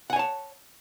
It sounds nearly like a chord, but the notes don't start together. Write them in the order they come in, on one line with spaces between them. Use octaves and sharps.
F#5 G#5 C#5 A5